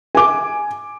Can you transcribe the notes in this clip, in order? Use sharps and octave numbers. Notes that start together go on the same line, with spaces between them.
G#5 D6